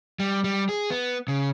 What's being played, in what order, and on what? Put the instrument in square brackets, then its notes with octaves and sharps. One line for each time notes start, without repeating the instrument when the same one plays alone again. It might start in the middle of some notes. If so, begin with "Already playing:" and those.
[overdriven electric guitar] G3
G3
G#4
B3
C#3